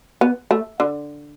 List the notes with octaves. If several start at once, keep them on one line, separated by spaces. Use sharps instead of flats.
B3
A3
D3